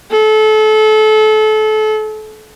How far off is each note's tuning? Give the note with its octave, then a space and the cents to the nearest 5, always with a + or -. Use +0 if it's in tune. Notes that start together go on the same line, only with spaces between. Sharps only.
A4 -30